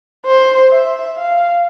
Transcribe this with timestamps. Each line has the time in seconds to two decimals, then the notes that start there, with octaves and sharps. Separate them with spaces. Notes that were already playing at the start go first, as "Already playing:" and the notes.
0.26 C5
0.71 E5
1.17 F5